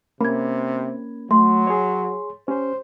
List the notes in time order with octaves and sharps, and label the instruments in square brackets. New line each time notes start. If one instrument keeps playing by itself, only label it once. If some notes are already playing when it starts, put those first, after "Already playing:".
[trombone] C3 [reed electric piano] A#3 C#4 [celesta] B5 G#6
[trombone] F#3 [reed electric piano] A3 [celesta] C6
[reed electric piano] G#4 C#5
[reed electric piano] C#4 G4 [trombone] C5